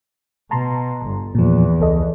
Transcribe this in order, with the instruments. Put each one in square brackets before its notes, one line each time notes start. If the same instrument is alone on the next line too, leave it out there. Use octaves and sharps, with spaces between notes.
[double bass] B2 [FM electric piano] A5 A#5 C6
[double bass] G1
[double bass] E2 [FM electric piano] A#2 F3
[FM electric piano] C#2 A4 D#5